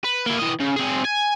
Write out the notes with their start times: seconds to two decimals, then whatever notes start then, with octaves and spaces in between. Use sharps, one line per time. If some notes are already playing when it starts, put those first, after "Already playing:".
0.04 B4
0.26 A#3 E4
0.39 E3 D#5
0.60 C#3
0.76 C4 G#4
1.05 G#5